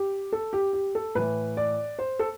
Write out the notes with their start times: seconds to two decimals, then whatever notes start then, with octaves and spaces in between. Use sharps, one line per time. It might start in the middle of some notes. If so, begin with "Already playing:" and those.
Already playing: G4
0.33 A4
0.53 G4
0.73 G4
0.95 A4
1.15 A2 E3 B4
1.57 D5
1.99 C5
2.19 A4